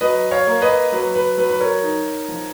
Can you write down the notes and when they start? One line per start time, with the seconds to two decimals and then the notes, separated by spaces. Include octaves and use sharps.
0.01 F#3 B4 D#5
0.31 C#5 F5
0.47 A#3
0.61 B4 D#5
0.92 F#3 B4
1.15 B4
1.38 F#3 B4
1.49 B4
1.60 A#4 C#5
1.83 D#4
2.28 F3